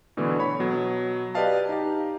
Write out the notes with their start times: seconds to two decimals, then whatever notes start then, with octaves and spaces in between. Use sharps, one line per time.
0.17 B2 D3 E3 A3
0.39 C#5 B5
0.60 B2 F#3
1.35 G4 B4 D5 D#5 F5 A5
1.69 D#4 G4